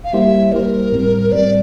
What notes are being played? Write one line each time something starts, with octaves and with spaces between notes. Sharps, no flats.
F5
G3 A#3 E4 G4 C5 E5
G3 A#3 E4 G4 A#4 C5
A2 G3 C4
A2 G3 C4 D5